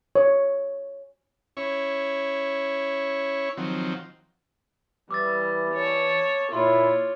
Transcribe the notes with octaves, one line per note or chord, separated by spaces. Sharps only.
C#5
C#4 E4 C#5
D#3 F3 F#3 C4
E3 G3 D6 E6 A6
C#5 A5
A#2 E4 F4 C#5 C6